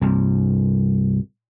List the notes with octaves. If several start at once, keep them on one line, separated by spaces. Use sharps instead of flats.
C2 G2